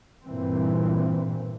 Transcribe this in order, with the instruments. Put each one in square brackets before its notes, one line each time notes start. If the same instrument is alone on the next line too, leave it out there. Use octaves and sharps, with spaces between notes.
[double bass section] G2 A#2 E3 C4